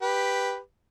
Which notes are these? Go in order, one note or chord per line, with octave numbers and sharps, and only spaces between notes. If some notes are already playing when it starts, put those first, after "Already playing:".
G4 B4